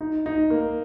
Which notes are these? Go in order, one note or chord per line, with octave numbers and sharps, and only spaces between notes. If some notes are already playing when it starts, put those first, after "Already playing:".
D#4
D#4
A#3